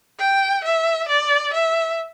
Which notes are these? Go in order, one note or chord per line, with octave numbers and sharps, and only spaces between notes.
G5
E5
D5
E5